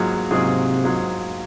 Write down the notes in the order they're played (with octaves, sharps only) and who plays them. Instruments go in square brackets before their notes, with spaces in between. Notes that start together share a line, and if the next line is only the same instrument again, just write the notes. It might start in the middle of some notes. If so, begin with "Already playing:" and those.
Already playing: [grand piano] G#2 F#3 A#3 F4 G#4
[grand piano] G#2 F#3 A#3 F4 G#4 [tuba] C3
[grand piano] G#2 F#3 A#3 F4 G#4